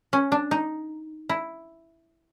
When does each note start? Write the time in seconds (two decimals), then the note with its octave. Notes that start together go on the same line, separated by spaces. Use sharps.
0.13 C#4
0.32 D4
0.51 D#4
1.29 E4